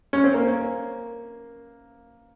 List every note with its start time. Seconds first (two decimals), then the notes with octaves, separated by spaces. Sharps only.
0.13 C#4
0.24 C4
0.34 A#3